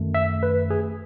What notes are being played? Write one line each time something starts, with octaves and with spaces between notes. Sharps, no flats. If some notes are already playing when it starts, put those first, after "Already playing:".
Already playing: F#2 D#3 A3
E5
B4
G#4